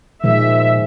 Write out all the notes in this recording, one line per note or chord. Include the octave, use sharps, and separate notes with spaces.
A#2 D#3 F3 G#3 E5